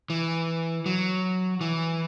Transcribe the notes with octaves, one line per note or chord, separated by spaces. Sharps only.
E3
F#3
E3